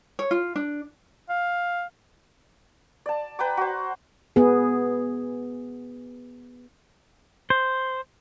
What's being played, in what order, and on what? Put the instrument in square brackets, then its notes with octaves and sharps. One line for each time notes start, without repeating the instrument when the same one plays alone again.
[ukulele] C#5
F4
D4
[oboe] F5
[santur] D5 A5
B4 G5 A#5 D6
F#4 C5
[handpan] B3 G#4
[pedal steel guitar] C5